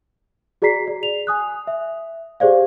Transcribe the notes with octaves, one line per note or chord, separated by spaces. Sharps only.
F#4 G#4 D5 A#5 B6 C7
D5
F7
G#5 D#6 F#6
E5
G4 G#4 C5 D5 F5